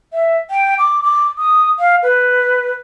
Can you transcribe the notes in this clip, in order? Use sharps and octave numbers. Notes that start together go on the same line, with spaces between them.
E5
G5
D6
D6
D#6
F5
B4